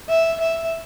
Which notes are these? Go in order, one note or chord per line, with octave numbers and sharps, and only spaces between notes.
E5
E5